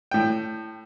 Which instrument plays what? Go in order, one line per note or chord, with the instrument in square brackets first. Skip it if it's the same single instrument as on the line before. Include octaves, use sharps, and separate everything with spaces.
[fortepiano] A2 G5